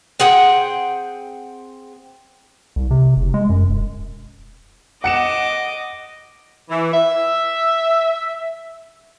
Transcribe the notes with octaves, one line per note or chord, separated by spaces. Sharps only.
C4 G#4 F#5 G5
C2
C3
F#1
G#3
F#2
E1
D#5 F#5 D6 C#7 E7
E3
E5